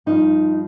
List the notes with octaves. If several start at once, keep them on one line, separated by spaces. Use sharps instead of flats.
G2 F3 D#4